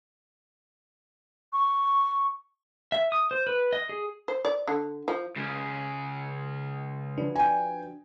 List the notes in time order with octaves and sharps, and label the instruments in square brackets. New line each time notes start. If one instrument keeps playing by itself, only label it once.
[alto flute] C#6
[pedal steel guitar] E5
D#6
C5
B4
D#5
G#4
[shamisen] C5
D5
D3
F3
[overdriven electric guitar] C#2 C#3
[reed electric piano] F3 F#4 B4 [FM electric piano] D4
[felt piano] G5 G#5